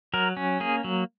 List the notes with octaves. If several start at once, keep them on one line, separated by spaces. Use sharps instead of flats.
F#3 A#4
C#4
A#3 G#4
F#3